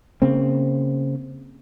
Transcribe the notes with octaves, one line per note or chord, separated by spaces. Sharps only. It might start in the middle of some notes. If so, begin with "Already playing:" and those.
C#3 A#3 C4